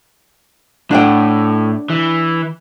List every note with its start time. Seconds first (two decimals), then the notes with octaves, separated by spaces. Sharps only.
0.91 A2 D4 F#5 G5
1.90 E3